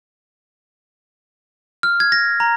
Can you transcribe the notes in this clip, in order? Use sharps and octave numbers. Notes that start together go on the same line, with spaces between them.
F6
G#6
A#6
A#5